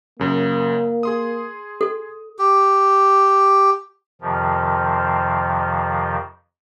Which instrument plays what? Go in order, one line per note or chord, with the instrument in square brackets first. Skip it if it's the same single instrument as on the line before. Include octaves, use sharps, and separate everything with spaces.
[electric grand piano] F#2 C#3 [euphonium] A#3
[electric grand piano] G#4 C6 D#6
[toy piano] A4
[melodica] G4
[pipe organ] F2 C3 D#3 F3